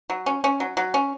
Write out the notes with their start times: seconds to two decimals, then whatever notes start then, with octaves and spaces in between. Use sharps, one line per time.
0.10 F#3
0.26 C#4
0.44 C#4
0.60 F#3
0.77 F#3
0.94 C#4